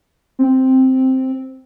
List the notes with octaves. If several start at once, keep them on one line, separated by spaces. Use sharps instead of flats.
C4